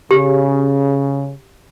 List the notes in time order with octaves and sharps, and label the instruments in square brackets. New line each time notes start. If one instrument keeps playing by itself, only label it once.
[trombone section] C#3 [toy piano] G4